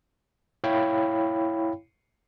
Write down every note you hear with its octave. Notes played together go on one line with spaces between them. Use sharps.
E4 C#5 F5 G5 B5